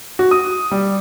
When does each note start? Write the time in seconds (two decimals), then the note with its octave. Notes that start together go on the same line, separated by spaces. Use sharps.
0.19 F#4
0.31 D#6
0.71 G3